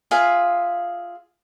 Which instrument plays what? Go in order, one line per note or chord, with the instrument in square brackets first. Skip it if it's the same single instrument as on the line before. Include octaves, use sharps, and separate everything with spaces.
[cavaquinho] F4 G#4 E5 F5